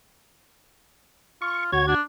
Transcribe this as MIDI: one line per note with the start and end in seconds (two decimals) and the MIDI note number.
1.42 1.72 65
1.42 1.64 85
1.72 1.94 38
1.72 1.94 66
1.72 1.86 73
1.72 1.94 92
1.88 2.02 62